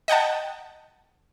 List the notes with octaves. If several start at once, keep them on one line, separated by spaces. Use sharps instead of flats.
D#5 F#5 G5 A5